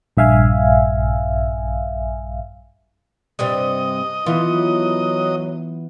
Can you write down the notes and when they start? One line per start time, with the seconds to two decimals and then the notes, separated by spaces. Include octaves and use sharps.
0.17 A#1 G2 E5 F5 G#5
3.39 G2 C3 G3 D#5
4.26 E3 B3 E4 F4
4.50 F#3